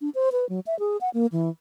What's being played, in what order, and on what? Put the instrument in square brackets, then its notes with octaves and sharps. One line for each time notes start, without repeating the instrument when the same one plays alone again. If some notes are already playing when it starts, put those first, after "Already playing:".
[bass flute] D4
C5
B4
F#3
E5
G#4
F#5
A#3
E3